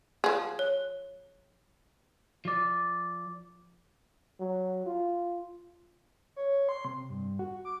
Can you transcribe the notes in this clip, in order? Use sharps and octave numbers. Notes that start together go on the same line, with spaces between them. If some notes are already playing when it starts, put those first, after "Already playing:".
F3 G#4
C#5
F3 D5
F#3
F4
C#5
C6
C3
G2
F#4
D6